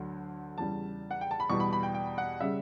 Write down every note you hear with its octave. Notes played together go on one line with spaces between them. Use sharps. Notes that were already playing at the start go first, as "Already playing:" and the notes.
Already playing: D2 D3 F#3
E2 C#3 G3 A5
F#5
G5
A5
B5
E2 B2 G3 C#6
B5
B5
G5
G5
F#5
C#3 G3 E5